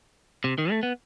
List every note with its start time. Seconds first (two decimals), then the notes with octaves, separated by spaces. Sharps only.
0.44 C3
0.58 D#3
0.71 A3
0.83 B3